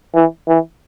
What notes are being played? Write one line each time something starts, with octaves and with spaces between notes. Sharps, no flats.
E3
E3